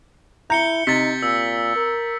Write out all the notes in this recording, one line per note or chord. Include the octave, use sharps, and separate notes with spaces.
E4 A#5 G6 C#7 G7
C3 D#4 A6 B6
A#2 E6
A#4